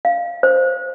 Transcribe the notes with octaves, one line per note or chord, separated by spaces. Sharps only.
F5
C5